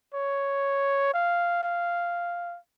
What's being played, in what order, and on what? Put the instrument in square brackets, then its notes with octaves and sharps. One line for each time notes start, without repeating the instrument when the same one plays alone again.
[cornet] C#5
F5
F5